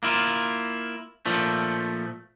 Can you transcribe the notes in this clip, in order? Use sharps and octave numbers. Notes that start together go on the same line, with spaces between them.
A#3 E4 F4
A#2 F3 A3